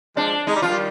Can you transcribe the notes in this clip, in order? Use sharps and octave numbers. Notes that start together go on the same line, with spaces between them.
F3 G#3 D4
G#3 D#4
G3
F3 F4
D#3 G3